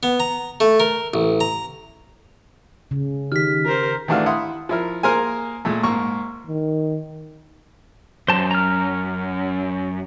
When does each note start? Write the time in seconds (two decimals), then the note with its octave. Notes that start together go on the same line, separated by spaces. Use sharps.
0.03 B3
0.20 A#5
0.60 A3
0.80 A#4
1.14 A1
1.40 A#5
2.91 C#3
3.32 D#3 G4 F6 B6
3.65 G4 A#4 C5
4.08 D#3 E3 A3 D4 F#4 F5
4.26 E4 F5 F#5 C6 D#6
4.69 F3 E4 A#4
5.03 A#3 G#4 A#4 C5 G#5
5.65 A#2 G#3 A3
5.83 G#2 A#3 C#6
6.47 D#3
8.28 F#2 C5 A5
8.51 A#5 F6